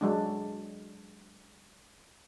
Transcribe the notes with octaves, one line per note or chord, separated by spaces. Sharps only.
F#3 G#3 D4